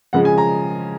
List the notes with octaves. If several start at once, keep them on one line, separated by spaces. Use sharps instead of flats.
C#3 F3 G#3 F#5
G#5
A#5